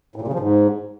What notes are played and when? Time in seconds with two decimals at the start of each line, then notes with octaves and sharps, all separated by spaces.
0.16 A2
0.22 A#2
0.28 C#3
0.33 F3
0.39 G#2